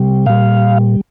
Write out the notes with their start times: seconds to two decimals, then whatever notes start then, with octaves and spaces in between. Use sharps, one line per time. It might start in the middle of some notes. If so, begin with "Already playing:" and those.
Already playing: C3 G3
0.26 A#2 G3 F5